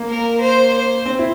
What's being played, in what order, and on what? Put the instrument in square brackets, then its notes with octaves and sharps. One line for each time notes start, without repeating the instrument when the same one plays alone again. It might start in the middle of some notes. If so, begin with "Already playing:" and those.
Already playing: [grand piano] A#3
[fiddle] A#4
C5
C5
[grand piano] C4
E4